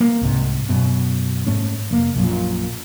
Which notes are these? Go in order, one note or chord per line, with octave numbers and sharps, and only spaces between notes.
A#3
C2 G#2 C3
F#2 B2
G#2 A3 C#4
F1 A#3
A#1 F#2 A#2